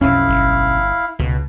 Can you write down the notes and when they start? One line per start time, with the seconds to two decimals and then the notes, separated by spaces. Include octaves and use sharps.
0.01 B1 F2 C#4 E4 F5
0.29 G1
1.19 C#2 B2